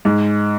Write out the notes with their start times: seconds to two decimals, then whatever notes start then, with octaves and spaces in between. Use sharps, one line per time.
0.05 G#2